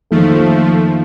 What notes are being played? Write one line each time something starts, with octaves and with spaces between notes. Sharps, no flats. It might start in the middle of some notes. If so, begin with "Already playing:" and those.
F2 D#3 F3 A3 A#3 D#4 A4